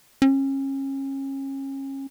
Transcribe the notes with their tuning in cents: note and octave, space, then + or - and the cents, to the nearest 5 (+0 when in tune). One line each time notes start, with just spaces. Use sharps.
C#4 -30